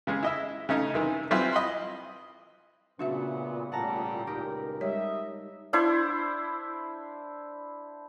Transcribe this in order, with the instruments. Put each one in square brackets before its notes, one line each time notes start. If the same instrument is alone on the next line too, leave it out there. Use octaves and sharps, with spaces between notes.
[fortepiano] C#3 G#3 C#4
E4 D#5 E5
C#3 A3 C#4 D#4
C3 D#3 E3
E3 F#3 G3 C4 E4 F4
D#5 B5 C6
[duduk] A#2 [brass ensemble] C#3 B3 [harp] A3 [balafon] D4 F#4 E5
[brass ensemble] A2 C#3 G3 [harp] F#5 A5 A#5
[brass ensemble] C#2 [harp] D#4 G4 A#4
[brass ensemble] G3 D#5 E5 [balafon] G#3 C#5
[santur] D4 E4 C5